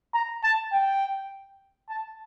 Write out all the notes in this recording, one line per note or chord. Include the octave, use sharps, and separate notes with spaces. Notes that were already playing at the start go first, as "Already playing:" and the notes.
A#5
A5
G5
A5